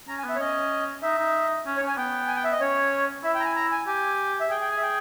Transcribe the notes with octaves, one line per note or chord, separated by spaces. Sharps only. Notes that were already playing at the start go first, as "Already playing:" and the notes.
C#4 A#5
G#5
B3
E5
C#5
C#4 D#5
D#4 E5
D#4
C#4
C#5
C#4 G#5
B3 G5
G#5
G5
E5
D#5
C#4 C#5
E4 E5
G5
A#5
G#5
A#5
G#5
G4 G#5
E5
G#4 G5
G5
G#5
E5
G5